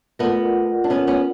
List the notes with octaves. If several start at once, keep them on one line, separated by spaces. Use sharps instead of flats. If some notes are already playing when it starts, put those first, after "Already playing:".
A3 B3 F4 A#4 D5 F#5
D4
B3 C#4
B3 C#4